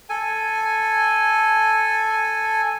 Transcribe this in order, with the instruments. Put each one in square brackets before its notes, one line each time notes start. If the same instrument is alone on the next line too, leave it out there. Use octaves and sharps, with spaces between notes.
[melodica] A4 G#5